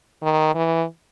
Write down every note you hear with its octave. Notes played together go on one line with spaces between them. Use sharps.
D#3
E3